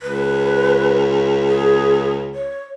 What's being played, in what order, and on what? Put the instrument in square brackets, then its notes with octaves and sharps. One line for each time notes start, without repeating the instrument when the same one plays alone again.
[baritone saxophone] C#2 [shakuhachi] B4
[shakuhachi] G#4
C#5